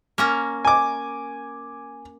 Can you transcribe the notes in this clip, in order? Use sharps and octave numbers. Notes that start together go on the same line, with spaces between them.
A#3 C#4 A#5
G#5 D6